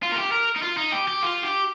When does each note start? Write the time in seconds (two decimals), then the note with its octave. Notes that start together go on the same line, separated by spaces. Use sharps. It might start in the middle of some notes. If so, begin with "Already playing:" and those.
0.03 F4
0.12 A#4
0.18 G4
0.32 A#4
0.56 D#4
0.63 F4
0.77 D#4
0.92 G4
1.08 G4
1.23 F4
1.43 G4